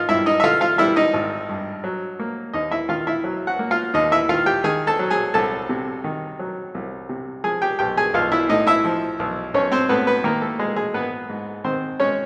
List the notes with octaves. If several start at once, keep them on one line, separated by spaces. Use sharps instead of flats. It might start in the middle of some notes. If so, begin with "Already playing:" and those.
Already playing: G#1 D#4 F4 F5
G2 E4 E5
D#4 D#5
E5
D3 F4 F5
F4 F5
G3 E4 E5
D#4 D#5
G#1
G2
F#3
A#3
D#2 D#4 D#5
E4 E5
D#3 F4 F5
E4 E5
F#3
F#4 F#5
A#3
F4 F5
D#2 D#4 D#5
E4 E5
D#3 F4 F5
G4 G5
D#3 G#4 G#5
A4 A5
F#3
G#4 G#5
C2 A4 A5
C3
D#3
F#3
C2
C3
F3 G#4 G#5
G4 G5
B1 G4 G5
G#4 G#5
B1 F4 F5
E4 E5
A2 D#4 D#5
E4 E5
F3
B1
B1 C#4 C#5
C4 C5
A2 B3 B4
B3 B4
D#3 A#3 A#4
A3 A4
G#3 G#4
G#3 G#4
G#1 B3 B4
G#2
D#3 C4 C5
G#3 C#4 C#5